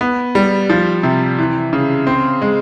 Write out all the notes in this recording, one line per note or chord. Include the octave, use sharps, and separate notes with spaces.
B3
G3
F3
C3
E3
C#3
C4
G#3